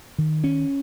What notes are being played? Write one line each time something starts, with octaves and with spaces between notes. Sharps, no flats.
D#3
C#4